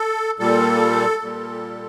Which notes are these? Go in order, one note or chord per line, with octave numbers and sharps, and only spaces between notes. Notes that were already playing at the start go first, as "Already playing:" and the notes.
Already playing: A4
A#2 G3 A4
A#2 G3